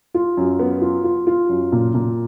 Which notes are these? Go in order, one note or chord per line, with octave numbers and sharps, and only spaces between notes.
F4
F#2
B3
F4
F4
F4
F#2
A#2
A#2